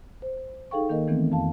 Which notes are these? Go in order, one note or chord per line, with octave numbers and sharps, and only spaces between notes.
C5
D#4 G#4 A4 F5 G5 C#6
D#3 A#3 A#4 D#5
D#3 E3 A3 B3 C4
F2 F5 A5